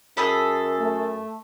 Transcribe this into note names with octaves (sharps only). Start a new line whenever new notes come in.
F#2 G#4 A4 B5
A3